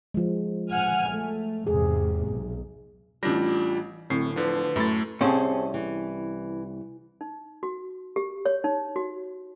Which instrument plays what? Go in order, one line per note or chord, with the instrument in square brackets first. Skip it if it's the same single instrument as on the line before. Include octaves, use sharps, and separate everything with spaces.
[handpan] F3 G#3
[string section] F#5 G#5 F6
A3
[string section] E2 G#2 C3 [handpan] G#4
[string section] B1
[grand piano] A1 A#6 [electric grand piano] G3 D4 [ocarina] F4
[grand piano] D1 [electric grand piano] A2 C7 [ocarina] C4
[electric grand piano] D3 F3 [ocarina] B4
[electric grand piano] F#2 A3 A6 [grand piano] A2
[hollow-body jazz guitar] C2 C#4 C5 [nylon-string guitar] C4 G#4 A4
[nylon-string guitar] E3
[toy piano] D#4
F#4
G4
C#5
D#4
F#4